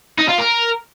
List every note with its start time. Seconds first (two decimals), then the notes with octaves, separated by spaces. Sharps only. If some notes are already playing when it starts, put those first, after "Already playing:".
0.18 D#4
0.28 F4
0.38 A#4